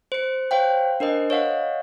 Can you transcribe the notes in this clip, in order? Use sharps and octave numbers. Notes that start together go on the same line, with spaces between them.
C5 C#7
C5 C#5 F5 G5
D4 A#4 C5 D#5
C#5 D#5 F5 F#5